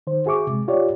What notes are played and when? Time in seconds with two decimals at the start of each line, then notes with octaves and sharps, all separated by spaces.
0.07 D#3 C5
0.26 F#4 G#4 E5 C#6 D6
0.47 C3 G#3
0.68 F4 G4 C#5 D5